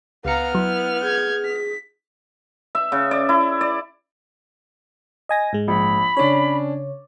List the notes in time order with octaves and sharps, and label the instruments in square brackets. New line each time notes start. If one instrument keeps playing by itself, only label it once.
[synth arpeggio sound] C#2 C#7 [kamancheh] B3 F6 [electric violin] F5 A#5
[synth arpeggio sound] F#3 [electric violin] E4
[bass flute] G#4 [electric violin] G6 G#6
[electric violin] B6
[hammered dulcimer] E5
C#3
D5
E4
D5
[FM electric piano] D#5 G#5 A#6
G#2 G#3
[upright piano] A#1 [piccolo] B5
[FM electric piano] C#3 C#5 [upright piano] C#4 D4